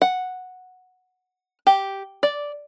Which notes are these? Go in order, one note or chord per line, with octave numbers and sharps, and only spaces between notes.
F#5
G4
D5